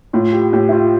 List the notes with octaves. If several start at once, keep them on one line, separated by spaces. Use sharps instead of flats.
A2 F4
G4
A2 G4
E4
F4